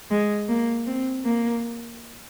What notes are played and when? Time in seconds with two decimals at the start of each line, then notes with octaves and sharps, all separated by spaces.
0.11 G#3
0.49 A#3
0.87 C4
1.25 A#3